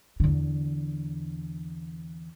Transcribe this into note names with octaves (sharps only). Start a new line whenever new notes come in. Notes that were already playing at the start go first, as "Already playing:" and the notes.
E2 D3